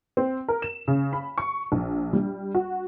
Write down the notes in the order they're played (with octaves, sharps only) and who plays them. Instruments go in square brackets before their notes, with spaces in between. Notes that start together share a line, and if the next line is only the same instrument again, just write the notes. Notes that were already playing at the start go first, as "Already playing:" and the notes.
[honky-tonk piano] C4
A#4
E7
C#3
B5
C#6
A#1
G3
F#4